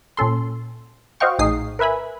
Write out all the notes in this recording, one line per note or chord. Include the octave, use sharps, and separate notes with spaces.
A#2 C#4 A4 C6
F#4 C5 D#5 F5 G5 C#6
A#1 A2 D#4 G#4 D#6 C7
A#4 B4 E5 G#5 B5